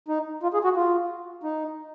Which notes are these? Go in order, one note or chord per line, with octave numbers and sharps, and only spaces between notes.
D#4
F4
G#4
F#4
F4
D#4